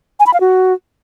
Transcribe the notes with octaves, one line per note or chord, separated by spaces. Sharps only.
G#5
B5
F5
F#4